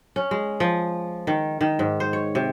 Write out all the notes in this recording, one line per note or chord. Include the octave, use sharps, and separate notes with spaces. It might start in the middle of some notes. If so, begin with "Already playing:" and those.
C#4
G#3
F3
D#3
D#3
G#2
C5
C#5
C3